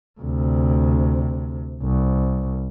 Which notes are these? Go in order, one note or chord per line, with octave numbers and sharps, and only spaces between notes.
D2 C3
C2